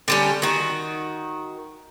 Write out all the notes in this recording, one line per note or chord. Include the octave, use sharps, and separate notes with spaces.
D3 G3 C#4
D#3 F#4